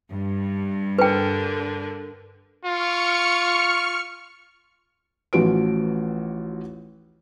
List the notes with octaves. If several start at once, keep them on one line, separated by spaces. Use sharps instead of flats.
G2
D3 A#4 B4 G5
F4 C#6 F6 C#7
A1 F3 F4 F#4 B4 D7